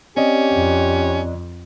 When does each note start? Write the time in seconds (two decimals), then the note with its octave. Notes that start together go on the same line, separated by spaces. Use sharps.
0.17 C4 C#4 G4 D5 D#5
0.54 F2